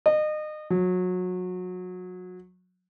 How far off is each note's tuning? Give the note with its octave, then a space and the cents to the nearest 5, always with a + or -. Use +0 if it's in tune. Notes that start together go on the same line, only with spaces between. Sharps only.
D#5 -30
F#3 -25